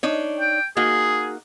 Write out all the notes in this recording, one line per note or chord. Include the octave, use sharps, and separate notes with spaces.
D4 D#4 C#5
G5
A#3 D#4 F#4 G#4